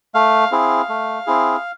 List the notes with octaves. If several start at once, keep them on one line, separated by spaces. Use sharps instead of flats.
A3 F5
C4 E4 G#4
A3
C4 E4 G#4